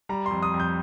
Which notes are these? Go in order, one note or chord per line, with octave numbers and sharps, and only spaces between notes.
G3 A#5
F2 C6
D#6
F2
G6